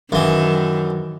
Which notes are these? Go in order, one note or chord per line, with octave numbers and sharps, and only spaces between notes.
F#2 D#3 E3